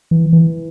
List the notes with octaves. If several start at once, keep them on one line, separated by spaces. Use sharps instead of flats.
E3
E3